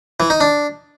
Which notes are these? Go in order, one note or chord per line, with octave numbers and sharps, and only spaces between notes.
E3
D#4
D4